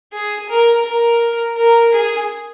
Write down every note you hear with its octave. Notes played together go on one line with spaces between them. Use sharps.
G#4
A#4
A#4
A#4
G#4